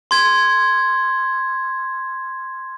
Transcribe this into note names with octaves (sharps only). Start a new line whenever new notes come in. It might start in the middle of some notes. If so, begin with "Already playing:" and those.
C6 G#6